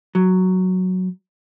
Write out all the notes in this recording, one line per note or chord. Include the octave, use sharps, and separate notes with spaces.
F#3